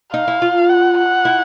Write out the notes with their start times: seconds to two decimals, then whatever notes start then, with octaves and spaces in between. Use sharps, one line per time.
0.14 D#4 F5
0.28 E4
0.42 F4
0.70 F#5
0.98 F#5
1.25 E4